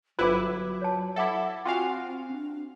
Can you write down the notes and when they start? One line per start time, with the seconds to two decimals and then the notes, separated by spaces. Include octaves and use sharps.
0.19 G1 F#3 E4 F4 B4 C5 D6
0.82 C#5 A5
1.16 E4 A4 E5 F#5 D6
1.65 C4 F4 F#4 F5 G5 G#5
2.32 D4